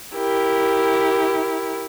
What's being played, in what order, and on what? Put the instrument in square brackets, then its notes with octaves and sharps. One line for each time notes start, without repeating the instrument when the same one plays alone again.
[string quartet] E4 G4 A#4